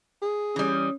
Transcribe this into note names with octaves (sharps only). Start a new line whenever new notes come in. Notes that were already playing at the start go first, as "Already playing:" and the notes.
G#4
E3 G3 C#4 D#6